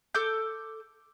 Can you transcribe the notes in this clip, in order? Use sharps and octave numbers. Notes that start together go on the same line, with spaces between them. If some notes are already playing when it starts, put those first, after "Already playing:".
A4 D6 G6